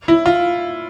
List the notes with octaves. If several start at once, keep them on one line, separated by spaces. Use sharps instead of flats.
E4
F4